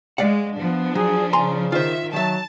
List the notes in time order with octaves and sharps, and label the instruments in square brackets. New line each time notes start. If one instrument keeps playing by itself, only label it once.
[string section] G#3 [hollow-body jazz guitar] D5 F5 F#5
[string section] F3 D4 [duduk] B3
[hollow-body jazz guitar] F#3 [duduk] G#4
[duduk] C#3 [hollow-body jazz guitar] G#5 A#5 C6
[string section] D#3 E5 [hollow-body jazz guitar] F4 C5
[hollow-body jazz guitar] D#3 E5 [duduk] F#3 [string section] A5